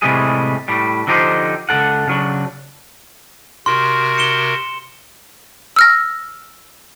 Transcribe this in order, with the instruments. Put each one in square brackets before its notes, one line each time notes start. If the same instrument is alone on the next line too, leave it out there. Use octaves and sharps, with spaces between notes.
[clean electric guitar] A2 C3 E3 G3 G#3 G#4
A2 G3
D3 F3 D#4 G4 C5
C#2 E3 A4 F#5
C#3 F#3 D4
[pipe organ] C3 F#4 A#4 [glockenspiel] C6
[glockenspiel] C#7 E7 G7
[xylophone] E6 F6 A#6